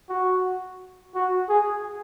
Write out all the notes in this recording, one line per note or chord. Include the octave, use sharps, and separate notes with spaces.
F#4
F#4
G#4